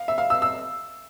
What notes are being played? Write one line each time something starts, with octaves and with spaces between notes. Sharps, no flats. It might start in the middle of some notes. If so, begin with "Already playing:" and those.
Already playing: F5
E5
F5
E6
E6